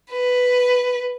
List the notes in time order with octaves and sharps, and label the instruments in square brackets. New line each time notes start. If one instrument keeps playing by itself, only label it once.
[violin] B4